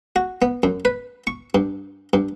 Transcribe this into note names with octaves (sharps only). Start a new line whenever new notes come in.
F#4
B3
F#2
B4
C#6
G2
G2